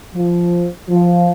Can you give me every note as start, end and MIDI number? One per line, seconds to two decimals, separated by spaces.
0.15 0.68 53
0.89 1.32 53